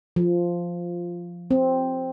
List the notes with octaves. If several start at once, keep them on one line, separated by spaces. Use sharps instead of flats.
F3
C4